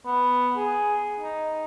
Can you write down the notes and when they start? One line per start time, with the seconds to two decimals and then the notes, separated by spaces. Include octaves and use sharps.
0.06 B3
0.56 G#4
1.20 D#4